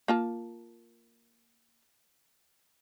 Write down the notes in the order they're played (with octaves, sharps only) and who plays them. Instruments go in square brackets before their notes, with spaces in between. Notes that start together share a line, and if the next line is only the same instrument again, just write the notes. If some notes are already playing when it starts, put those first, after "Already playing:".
[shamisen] A#3 F4 A5